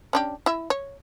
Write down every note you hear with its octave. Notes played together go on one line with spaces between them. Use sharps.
C#4 D4 G4
E4 E5
C#5